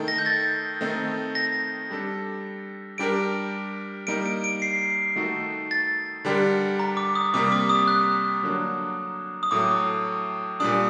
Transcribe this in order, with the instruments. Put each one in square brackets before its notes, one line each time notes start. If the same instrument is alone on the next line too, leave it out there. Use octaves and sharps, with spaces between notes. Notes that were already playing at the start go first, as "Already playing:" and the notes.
Already playing: [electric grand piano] D#3 A3 D#4 A4
[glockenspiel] A#6
G6
A6
[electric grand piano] D#3 A3 C4 D#4
[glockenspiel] A#6
[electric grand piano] G3 D4 A4
[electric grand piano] G3 D4 G4 A#4 [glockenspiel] D7
[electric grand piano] G3 A#3 D#4 [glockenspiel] D7
[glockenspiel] D7
D7
C7
[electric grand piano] D#3 A3 D#4 F#4 A4
[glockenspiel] A6
[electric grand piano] D3 G3 D4 G4 A#4
[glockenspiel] A#5
D6
D#6
[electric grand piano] C3 G3 A#3 [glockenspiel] D6
[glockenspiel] D6
D#6
F#6
[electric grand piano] D3 F#3 A#3 D4
[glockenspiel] D#6
[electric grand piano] A2 F#3 A3 [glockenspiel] D6
[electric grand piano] A#2 G3 D4 [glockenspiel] D#6